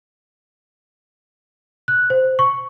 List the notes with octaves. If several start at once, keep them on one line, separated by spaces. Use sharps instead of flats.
F#6
C5
C#6